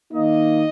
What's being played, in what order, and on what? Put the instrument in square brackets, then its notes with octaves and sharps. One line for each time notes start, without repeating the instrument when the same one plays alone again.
[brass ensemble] D#3 A#3 D#4 D#5